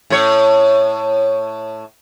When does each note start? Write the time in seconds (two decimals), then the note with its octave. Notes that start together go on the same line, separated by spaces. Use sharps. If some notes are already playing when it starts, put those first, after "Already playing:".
0.10 A2 C#5